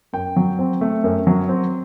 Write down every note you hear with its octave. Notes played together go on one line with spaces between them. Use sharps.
F#2 G5
F#3
C4
A3
F#2
F#3
C4